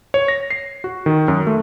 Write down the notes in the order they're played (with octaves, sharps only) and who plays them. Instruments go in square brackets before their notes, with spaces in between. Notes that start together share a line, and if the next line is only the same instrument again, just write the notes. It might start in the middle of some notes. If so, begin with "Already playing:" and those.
[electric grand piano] C#5
A#6
C7
F#4
D#3
F#2
A3